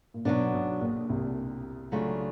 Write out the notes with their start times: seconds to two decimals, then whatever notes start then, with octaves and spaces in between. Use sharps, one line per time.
0.14 A#2
0.25 B1 B2 F#3 B3 D4
0.53 B1 B2
0.81 A#1 A#2
1.09 C2 C3
1.92 C#3 F#3 A3 D4 F4